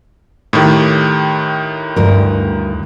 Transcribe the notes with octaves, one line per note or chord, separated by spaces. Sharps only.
A2 D#3 G4
D2 G2 A#4